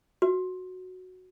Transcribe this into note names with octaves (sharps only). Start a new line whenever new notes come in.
F#4